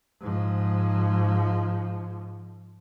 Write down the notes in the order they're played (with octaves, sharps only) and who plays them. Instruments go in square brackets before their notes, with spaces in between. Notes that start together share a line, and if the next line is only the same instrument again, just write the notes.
[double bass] G#2 F3